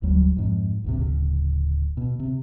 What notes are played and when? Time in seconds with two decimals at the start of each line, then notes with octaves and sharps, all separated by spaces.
0.02 E1 D2 F#3 G3
0.37 F2 G#2 F3
0.84 D#1 A1 C3
0.99 D1 C#3
1.97 B2
2.19 C3